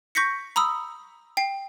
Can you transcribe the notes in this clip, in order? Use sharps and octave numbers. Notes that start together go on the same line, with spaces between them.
C#6 G6 A#6 B6 C#7
A#5 B5 D#6 E6
G5 C7